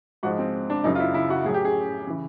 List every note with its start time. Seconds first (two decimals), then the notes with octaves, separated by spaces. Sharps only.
0.23 G#2 F3 G#3 F#4
0.39 C4
0.70 D4
0.84 F#2 C#3 F#3 D#4
0.95 F4
1.00 E4
1.14 E4
1.30 F#4
1.44 A2 F#3 G#4
1.54 G4
1.65 G#4
2.07 C#3 E3